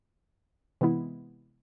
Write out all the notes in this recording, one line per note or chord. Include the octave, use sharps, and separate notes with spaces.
C3 E3 G#3 B3 E4